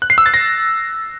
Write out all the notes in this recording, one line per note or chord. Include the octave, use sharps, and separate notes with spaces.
F#6
C7
E6
A6
A#6